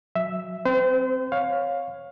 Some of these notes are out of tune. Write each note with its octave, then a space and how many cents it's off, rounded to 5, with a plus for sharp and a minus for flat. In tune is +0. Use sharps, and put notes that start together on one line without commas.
F#3 -10 E5 +0
C4 +0 C5 -35
C#5 +0 F5 +15